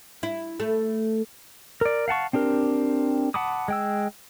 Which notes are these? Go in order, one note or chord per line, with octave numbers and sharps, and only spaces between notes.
E4
A3
A#4 D5
F5 F#5 A5 C#6
C4 D4 G4 A#4
F#5 A5 B5 D6 D#6
G#3 G5 E6